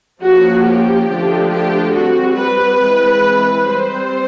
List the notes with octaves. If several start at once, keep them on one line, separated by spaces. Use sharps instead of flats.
F3 A#3 C#4 F#4
G4
D3 F3 A3 D4
G4
G3 F#4
C4
B4
E3 G#3 C4
G3 C4 C5